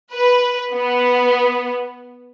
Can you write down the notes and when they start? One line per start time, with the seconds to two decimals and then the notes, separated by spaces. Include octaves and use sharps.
0.13 B4
0.73 B3